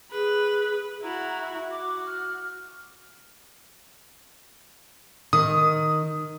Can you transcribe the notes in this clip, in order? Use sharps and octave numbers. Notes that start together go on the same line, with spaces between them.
G#4 B4
E4 F#4 A#5
E5
F#4 D6
F6
D#3 D#6